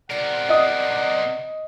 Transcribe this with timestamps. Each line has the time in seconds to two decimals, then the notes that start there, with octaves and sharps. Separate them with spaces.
0.10 C3 A#4 D5 F#5
0.49 D#5 D#6